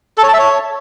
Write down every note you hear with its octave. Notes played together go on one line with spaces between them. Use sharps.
A4
C#5
A5
E5
C#5